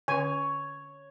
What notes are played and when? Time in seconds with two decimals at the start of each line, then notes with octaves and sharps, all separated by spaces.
0.08 D3 C#4 C#5 G#5